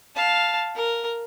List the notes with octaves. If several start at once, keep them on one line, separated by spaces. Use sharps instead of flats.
F5 A5
A#4